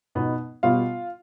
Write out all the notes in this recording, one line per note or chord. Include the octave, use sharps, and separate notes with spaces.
B2 B3 D#4
B2 G3 B3 F4 F5